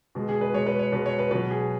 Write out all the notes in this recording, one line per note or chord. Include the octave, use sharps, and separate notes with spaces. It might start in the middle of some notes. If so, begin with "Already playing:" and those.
B2 G#3
G#4
B4
B2 G#3 C#5
B4
C#5
B2 G#3 B4
C#5
B4
B2 F#3 B4
G#4